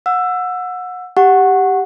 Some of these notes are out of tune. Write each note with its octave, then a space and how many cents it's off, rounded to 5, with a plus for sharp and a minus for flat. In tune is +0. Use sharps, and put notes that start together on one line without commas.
F#5 -25 E6 +15
G4 +0 F#5 +0 C#6 -15